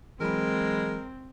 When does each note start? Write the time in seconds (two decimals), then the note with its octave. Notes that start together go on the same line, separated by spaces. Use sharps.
0.20 E3 F#3 G#3 C4 A#4 B5